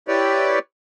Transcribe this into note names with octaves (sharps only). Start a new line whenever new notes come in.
E4 G4 B4 C#5 D5